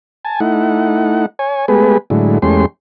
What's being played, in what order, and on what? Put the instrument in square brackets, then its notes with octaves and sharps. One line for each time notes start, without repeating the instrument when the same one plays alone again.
[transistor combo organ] G#5 A5
A3 D#4 E4 F#5
C#5 G#5
G#3 A3 B3 G4 G#4 B4
A2 D3 F#3 G#3 E4
E2 G#3 A3 C#4 G4 C6